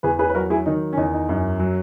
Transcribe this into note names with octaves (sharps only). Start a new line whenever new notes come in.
E2 G#4 B4
G#4 B4
B4
F#3 F#4 A#4
E4 G#4
D#3 D#4
C#4
E2 D#4
D#4
F#2
F#3